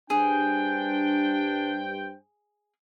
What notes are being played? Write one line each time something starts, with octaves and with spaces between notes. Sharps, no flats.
G2 D4 G#4 C5 G5